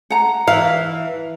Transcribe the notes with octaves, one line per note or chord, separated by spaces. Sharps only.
F#5 A#5
E3 F5